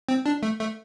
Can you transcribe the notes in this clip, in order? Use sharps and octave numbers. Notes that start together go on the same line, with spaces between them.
C4
D4
A3
A3